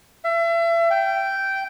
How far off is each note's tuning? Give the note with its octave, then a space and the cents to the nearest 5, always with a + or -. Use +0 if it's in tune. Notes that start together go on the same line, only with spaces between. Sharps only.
E5 +35
G5 -10